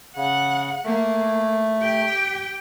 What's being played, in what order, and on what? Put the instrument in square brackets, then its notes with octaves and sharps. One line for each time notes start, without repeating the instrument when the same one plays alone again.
[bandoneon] C#3 [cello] F#5
[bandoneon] A3 [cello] A#3
[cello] G4 G5